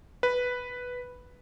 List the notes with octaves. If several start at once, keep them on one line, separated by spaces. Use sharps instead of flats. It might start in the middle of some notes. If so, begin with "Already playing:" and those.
B4